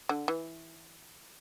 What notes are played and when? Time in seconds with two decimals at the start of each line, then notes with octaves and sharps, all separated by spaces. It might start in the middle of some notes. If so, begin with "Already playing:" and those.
0.09 D3
0.28 E3